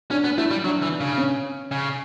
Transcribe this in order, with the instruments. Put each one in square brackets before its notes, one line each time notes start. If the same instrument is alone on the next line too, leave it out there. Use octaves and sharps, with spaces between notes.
[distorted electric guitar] C#4 [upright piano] D4
[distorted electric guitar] B3
[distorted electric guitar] A3 [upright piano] E4
[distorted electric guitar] G3
[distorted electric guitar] F#3 [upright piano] D4
[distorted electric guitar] E3
[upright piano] D4
[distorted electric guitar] C#3
[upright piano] C#4
[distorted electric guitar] C#3